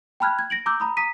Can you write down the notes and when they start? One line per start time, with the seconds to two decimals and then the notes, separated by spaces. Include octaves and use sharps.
0.20 G5 A5 B5 F6 F#6 G#6
0.39 G#6
0.50 A#6 D7 F#7
0.66 A#5 D6 E6 G6
0.80 A#5 B5 D#6
0.97 A#5 D#6 B6 D#7